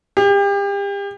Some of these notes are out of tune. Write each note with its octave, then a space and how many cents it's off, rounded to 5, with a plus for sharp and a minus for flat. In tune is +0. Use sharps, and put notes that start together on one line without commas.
G4 +35